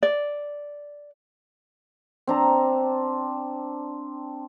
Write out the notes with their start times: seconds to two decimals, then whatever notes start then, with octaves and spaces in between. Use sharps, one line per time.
0.03 D5
2.27 C4 D4 A#5